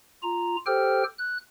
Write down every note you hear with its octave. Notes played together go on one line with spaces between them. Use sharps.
F4 A#5
G4 A4 C5 G5 F6
F#6